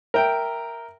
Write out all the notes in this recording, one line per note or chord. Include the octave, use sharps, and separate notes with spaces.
A#4 E5 G5